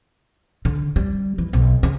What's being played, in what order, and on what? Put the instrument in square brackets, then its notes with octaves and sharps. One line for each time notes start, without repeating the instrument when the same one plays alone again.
[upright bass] D3
G3
E3
B1
C#3